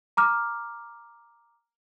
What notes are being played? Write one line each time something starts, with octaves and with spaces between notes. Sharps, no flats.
A#5 D6 F6